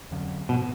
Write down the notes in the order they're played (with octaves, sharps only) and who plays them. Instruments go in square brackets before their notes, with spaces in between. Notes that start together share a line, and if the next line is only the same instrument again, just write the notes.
[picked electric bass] F2 D3 F#3 C#4
[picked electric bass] G#2 F3 B3 [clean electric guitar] B2